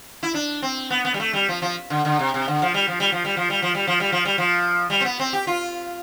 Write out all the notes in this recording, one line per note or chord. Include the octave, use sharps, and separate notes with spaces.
E4
D4
C4
B3
B3
G3
A3
G3
F3
F3
D3
D3
C3
C3
D3
F3
G3
F3
G3
F3
G3
F3
G3
F3
G3
F3
G3
F3
G3
F3
G3
C4
B3
C4
G4
F4